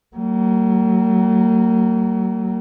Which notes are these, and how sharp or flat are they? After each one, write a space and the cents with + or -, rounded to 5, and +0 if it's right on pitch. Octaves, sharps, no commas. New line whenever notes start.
F#3 +35 A#3 -35